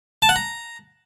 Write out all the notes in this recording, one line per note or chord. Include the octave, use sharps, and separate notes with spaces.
A5
F#5
A#5